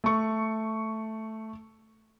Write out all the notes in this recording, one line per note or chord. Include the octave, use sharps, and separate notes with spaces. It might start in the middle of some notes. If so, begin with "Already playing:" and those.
A3 C#6